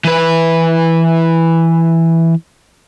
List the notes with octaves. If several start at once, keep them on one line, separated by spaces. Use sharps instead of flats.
E3 B4